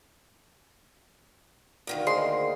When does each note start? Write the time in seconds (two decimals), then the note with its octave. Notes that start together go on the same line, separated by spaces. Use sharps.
1.87 D2 D#3 A#3
2.07 G#4 C5 D#5 C6